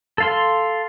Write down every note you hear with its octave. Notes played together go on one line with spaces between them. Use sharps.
A4 F5 C6